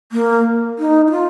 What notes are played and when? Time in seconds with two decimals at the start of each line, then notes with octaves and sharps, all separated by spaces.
0.12 A#3
0.79 D#4
1.07 D#4
1.11 F4